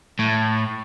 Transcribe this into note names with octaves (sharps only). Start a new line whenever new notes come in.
A2